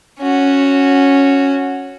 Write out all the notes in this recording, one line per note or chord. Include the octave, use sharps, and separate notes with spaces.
C#4 F#4